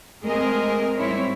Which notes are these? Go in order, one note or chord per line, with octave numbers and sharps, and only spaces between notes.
G#3 A3 C4 G#4 A#4 D#5
G#2 G3 C4 E4 C#5